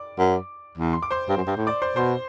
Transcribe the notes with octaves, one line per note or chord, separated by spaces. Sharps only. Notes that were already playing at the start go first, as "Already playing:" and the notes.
Already playing: D5 D6
F#2
E2
C6
D6
C5 C6
G2
F#2
G2
A2
D5 D6
C5 C6
B2 C5 C6